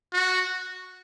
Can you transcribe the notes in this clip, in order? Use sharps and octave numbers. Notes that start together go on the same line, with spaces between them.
F#4